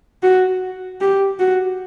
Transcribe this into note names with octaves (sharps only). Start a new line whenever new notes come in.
F#4
G4
F#4